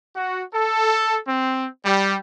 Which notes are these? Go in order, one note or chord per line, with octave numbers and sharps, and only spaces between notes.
F#4
A4
C4
G3